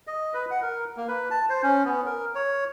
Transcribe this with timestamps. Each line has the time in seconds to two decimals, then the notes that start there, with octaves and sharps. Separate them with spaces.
0.07 D#5
0.34 B4
0.51 F#5
0.62 A#4
0.97 A#3
1.08 B4
1.31 A5
1.49 C5
1.63 C#4
1.85 B3
2.06 A#4
2.35 C#5